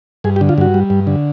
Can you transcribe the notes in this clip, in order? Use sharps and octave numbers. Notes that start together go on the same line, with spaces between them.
G2 G#4
G4
D3
F4
G2 F#4
G3
G2
D3